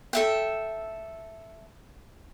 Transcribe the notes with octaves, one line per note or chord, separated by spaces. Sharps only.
A4 E5 G5